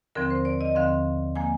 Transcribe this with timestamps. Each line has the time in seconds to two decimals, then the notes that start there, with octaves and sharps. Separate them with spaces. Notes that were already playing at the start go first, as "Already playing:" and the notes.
0.15 D#2 D3 F3 C4 A#4
0.30 C5
0.45 D5
0.61 D#5
0.75 D#2 D3 F3 C4 F5
1.35 F3 A#3 G#5